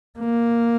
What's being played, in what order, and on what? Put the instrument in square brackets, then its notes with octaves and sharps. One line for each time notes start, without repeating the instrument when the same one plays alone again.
[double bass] A#3